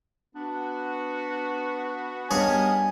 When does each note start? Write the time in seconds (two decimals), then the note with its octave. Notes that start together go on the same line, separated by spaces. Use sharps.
0.36 B3 D4 F#4
2.31 G2 B3 C#4 G#4 A#4 C#5 D#5 G#5